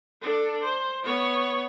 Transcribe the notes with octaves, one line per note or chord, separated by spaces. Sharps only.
D4 A4
C5
B3 C#5